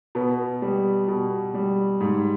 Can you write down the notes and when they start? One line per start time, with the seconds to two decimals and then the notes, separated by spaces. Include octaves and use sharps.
0.15 B2 B3
0.62 G3
1.08 B2
1.54 G3
2.00 G#2